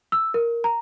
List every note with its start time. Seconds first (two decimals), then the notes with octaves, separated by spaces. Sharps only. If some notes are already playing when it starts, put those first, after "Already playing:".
0.12 E6
0.34 A#4
0.64 A#5